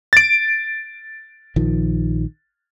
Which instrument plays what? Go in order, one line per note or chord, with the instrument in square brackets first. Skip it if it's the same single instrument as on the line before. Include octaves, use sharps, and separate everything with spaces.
[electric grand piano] A6 D7
[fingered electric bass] A#1 D#3 F3